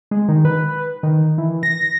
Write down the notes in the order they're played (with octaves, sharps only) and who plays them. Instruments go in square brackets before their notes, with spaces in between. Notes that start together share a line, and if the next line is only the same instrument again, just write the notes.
[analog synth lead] G#3
D#3
B4
D#3
E3
A#6